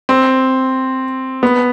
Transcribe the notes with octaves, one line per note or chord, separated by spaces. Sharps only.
C4
B3